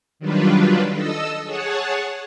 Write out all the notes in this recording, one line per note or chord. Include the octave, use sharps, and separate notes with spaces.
D#3 F#3 G3 D4 F4 B4
A4 D#5 E6
G#4 C#5 F#5 A5